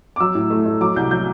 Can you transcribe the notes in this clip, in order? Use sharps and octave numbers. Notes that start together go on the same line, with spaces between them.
D6
F#3 E6
A2
A3
A3
F#3 D6
C2 G6
F#3 G6